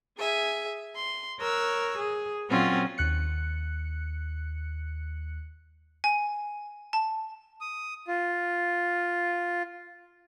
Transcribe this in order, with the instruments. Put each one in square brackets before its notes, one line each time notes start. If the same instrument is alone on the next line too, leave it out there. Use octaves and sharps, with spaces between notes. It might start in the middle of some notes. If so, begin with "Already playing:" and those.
[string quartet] G#4 E5 G#5
C6
A#4 C#5 E6 F#6
G#4
A#2 F#3 C4 C#4 F4 F#4
[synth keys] D#2 F#6 C#7
[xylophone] G#5
A5
[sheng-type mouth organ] D#6
F4